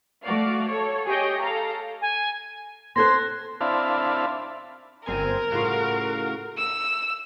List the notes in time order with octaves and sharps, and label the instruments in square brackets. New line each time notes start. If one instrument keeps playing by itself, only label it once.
[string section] A3 F#4 D5 F5
A4 C#5
G4 G#4 C#5 D#5 G5
A4 F5 A#5
[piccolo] G#5
[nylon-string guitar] C4 A4 C5 [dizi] C6 [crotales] F#6 G#6 A#6
[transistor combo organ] C4 D4 E4 F5 A5 B5
[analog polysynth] G1 C4 G#5 [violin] A#4
[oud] A2 C#3 F4 [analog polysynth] F#4 F5
[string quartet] E6